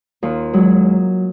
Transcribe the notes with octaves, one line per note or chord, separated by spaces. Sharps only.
D#2 F4
F#3 G#3